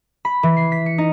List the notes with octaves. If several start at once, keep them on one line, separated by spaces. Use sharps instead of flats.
B5
E3
C7
B6
C#7
D#4